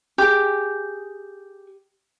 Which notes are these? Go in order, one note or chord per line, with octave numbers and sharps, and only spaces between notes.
G4 G#4